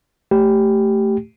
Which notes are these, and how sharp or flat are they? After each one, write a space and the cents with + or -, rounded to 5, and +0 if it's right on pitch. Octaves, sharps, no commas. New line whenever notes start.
A3 +0 G4 -10